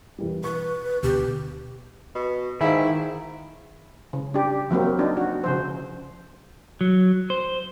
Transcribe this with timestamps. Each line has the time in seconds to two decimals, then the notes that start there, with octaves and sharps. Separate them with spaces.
0.18 E1 E3 G3
0.44 B4 C#6
1.03 D2 B2 G4
2.15 B2
2.61 G#2 D#3 D#4 E4 F5
4.13 C#3
4.34 D4 G4
4.71 F3 F#3 A#3 C4
4.99 D4 D#4
5.17 F#4
5.44 C#3 F3 C5
6.81 F#3
7.30 C5